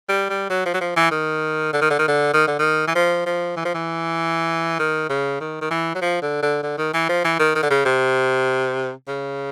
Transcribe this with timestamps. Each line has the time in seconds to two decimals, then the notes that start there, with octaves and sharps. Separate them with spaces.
0.09 G3
0.30 G3
0.50 F#3
0.66 F3
0.74 F#3
0.81 F3
0.96 E3
1.11 D#3
1.73 D3
1.81 D#3
1.90 D3
1.99 D#3
2.08 D3
2.34 D#3
2.47 D3
2.59 D#3
2.88 E3
2.95 F3
3.26 F3
3.57 E3
3.65 F3
3.74 E3
4.79 D#3
5.10 C#3
5.40 D#3
5.61 D#3
5.71 E3
5.95 F#3
6.01 F3
6.22 D3
6.42 D3
6.63 D3
6.78 D#3
6.94 E3
7.09 F3
7.24 E3
7.39 D#3
7.55 D#3
7.63 D3
7.70 C#3
7.85 C3
9.08 C#3